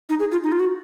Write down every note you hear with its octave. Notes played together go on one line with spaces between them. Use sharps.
D#4
G#4
F4
D#4
F4
F#4